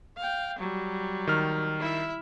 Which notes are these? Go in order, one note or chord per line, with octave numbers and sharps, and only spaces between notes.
F5 G5
F#3 G3
D#3 F6
E4 E5